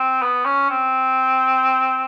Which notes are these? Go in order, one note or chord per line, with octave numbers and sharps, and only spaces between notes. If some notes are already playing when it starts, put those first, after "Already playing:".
Already playing: C4
B3
C#4
C4